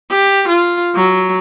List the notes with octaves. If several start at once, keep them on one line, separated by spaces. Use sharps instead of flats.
G4
F4
F#3